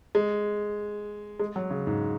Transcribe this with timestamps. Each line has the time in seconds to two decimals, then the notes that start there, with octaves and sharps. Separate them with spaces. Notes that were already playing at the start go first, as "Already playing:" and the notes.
0.15 G#3
1.40 G#3
1.56 F#3
1.70 C#3
1.87 G#2